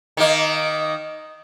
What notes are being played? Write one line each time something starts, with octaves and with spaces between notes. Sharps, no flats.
D#3 A#3